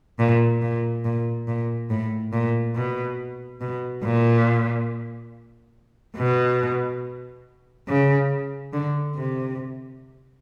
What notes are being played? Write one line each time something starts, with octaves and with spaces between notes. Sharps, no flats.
A#2
A#2
A#2
A#2
A2
A#2
B2
B2
A#2
B2
C#3
D3
C3